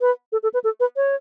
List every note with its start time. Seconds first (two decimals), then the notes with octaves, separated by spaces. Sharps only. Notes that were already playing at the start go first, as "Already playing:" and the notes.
0.01 B4
0.32 A4
0.43 A4
0.54 B4
0.64 A4
0.80 B4
0.96 C#5